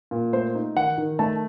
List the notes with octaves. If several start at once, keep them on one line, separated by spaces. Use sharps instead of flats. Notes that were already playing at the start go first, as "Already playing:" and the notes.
A#2
A3 C5
D#4
D#3 F#5
D#3
A3 A5